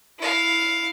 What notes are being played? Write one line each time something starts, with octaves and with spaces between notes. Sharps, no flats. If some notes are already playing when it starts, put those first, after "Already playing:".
E4 F5